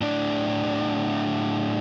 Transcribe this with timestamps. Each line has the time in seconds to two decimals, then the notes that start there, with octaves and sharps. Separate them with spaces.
0.01 A2 D4